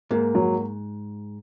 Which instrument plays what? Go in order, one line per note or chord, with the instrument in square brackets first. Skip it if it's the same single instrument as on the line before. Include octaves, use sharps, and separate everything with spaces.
[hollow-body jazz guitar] G#2 [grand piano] A#3
[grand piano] F#3